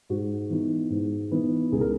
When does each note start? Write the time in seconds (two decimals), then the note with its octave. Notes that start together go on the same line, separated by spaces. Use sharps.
0.10 G#2 F#4
0.50 E3 B3 D#4
0.90 G#2
1.31 E3 B3 D#4
1.72 C#2 G#4
1.81 A#4